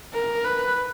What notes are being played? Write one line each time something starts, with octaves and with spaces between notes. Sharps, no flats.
A#4
B4